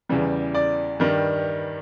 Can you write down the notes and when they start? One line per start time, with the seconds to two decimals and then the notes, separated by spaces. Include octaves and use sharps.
0.09 E2 C#3 E3 G3
0.55 D5
1.00 G2 D#3 G3